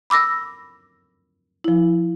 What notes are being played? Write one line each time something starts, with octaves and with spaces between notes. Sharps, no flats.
B5 D6 E6 A#6
F3 E4